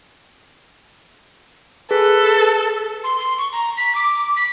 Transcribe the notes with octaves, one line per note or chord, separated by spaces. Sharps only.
G#4 A4 B4
C6
C6
C#6
A#5
B6
D6
B6